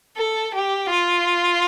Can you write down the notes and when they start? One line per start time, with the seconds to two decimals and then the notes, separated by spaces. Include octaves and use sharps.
0.17 A4
0.54 G4
0.91 F4